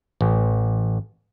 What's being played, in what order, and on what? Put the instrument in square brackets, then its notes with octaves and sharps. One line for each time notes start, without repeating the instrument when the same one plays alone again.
[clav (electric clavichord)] A1